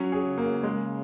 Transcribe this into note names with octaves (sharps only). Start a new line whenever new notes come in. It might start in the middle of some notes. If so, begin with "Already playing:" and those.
Already playing: F#3 C#4
G#4
C#3
A#3
G#3